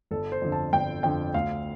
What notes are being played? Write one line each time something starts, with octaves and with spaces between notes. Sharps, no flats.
G1 A4
C5
F2 D3
A5
G1 G5
F2 D3 G5
D2 F5